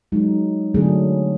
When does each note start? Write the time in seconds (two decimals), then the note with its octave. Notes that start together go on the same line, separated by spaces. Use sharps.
0.12 F#3 G#3 D#4
0.74 D3 F#3 A3 C4 D4 G#4